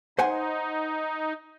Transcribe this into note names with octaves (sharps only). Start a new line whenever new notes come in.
D#4 C5 F#5 G#5